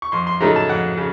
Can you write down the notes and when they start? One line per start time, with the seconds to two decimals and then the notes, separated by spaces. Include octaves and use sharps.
0.02 C#6
0.12 F2 C6
0.27 C6
0.40 C#3 F#3 A3 D#4 A#5
0.56 A5
0.69 F2 F#5
0.97 C#3